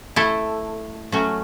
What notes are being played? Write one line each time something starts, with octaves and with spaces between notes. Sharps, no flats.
A3 E4 A4
F#3 A3 C#4 F#4